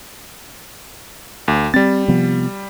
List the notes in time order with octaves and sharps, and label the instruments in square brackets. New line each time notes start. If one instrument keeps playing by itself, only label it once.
[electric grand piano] D2
[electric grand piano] G3 A6 [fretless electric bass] C4
[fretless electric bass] C3 F3 B3